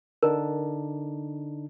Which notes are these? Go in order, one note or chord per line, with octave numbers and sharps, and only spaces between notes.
D3 D4 D#4 A#4